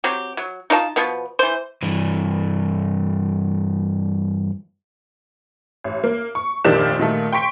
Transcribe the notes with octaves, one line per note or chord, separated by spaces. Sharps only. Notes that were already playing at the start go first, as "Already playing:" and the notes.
F#3 C4 G4
F#3
D#4 F4 C#5 A5
B2 F3 B3
E3 C5
G2 E3
A1
A#3
C#6
F1 A#2 D#3 D4 G4 E7
A#2 D#3 A3
G5 C6 C#6 B6 D7